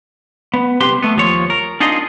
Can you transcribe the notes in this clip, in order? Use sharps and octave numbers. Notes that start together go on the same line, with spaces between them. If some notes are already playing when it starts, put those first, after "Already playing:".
B3
C2 C4 G4 B4 C6
A3 B3
D#2 F3 C#5
A#4
D4 D#4 F4 G#4 A#4 D#5